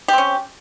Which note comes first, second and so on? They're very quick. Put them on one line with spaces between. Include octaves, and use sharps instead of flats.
G4 C4 C#4